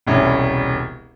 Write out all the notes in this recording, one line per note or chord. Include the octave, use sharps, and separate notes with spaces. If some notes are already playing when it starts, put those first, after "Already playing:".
E1 C2 C#4